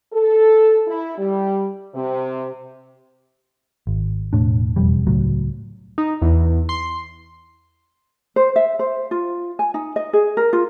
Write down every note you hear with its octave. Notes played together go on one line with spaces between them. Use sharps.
A4
E4
G3
C3
G#1
E1 A2 D4
E1 F2 G3
C#2 A2 F#3
D#4
E2
C6
C5
E5
C5
F4
G#5
D#4
D#5
G#4
A#4
F4